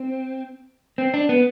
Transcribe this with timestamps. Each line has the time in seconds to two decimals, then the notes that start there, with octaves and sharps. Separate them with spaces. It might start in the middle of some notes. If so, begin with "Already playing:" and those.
Already playing: C4
0.98 C4
1.14 D4
1.29 B3